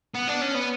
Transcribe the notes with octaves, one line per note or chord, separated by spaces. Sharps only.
B3
D4
C#4
B3